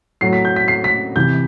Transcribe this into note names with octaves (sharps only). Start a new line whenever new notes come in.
A2 F#3 C7
B6
G6
B6
C7
B6
C3 E3 G6